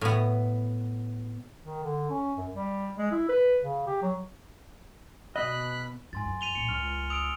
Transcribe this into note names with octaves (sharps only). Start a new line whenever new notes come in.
A2 B3
D#3
D3
C#4
F#2
G3
G#3
E4
B4
C#3
G4
F#3
B2 D#5 B5 F#6
G#2 G#5 C6 A6
F#2
D#7 F7 G7
A#1 A#2 C#7
C#2 C#3 C#6 F6
D#6 E6 D7 F7